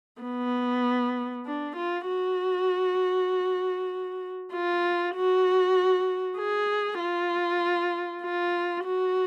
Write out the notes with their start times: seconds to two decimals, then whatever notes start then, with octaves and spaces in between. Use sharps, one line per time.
0.22 B3
1.46 D4
1.77 F4
2.07 F#4
4.53 F4
5.15 F#4
6.38 G#4
6.99 F4
8.22 F4
8.84 F#4